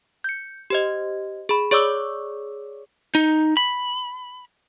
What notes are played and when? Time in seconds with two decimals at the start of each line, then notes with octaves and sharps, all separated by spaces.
0.24 G6 C#7
0.70 G4 C5 D#5
1.49 G#4 B5
1.71 G#4 C#5 D5 C#6 D6 E6
3.15 D#4
3.57 B5